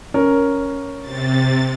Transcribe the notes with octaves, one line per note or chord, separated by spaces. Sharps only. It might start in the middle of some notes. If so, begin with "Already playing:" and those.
C#4 A#4
C3 A6